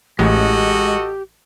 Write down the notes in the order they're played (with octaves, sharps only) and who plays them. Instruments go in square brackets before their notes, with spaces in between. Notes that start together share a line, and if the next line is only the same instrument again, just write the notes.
[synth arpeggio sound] A1 [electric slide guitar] G#3 [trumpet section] F#4 A4 D#5 [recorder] G4